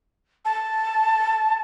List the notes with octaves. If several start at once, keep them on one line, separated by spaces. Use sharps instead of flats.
A5